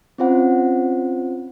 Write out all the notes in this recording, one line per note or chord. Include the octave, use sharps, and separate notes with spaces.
C4 C#4 F4 C5 F#5